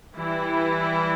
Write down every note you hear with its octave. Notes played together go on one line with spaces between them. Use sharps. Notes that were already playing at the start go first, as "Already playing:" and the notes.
E3 G3 E4